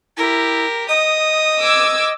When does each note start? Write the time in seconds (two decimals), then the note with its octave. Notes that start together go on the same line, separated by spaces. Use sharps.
0.17 E4 G4 A#4
0.89 D#5 D#6
1.60 D6 E6 G#6